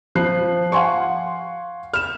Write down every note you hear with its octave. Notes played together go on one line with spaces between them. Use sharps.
F3 F#6 C7
F5 F#5 G#5 C6 C#6
F6 E7